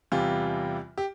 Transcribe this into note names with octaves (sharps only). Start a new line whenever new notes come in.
E2 C3 E3 G3 F4
G4